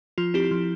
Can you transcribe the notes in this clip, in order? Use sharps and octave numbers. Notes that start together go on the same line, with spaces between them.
F3 F4
C4 E4 G4
F3